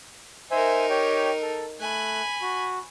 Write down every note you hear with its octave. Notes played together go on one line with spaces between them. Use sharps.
D#4 A#4 C5 E5 G#5
G4 C#5 G5
A4
A3 G#5 B5 F#6
F#4